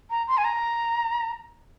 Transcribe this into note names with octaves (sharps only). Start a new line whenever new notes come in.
A#5
C6
G#5
A#5